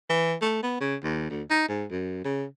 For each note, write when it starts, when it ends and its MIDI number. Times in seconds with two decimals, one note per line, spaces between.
0.09 0.34 52
0.41 0.62 57
0.63 0.79 59
0.81 0.96 49
1.03 1.28 39
1.30 1.43 38
1.50 1.67 63
1.68 1.85 44
1.90 2.20 42
2.25 2.45 49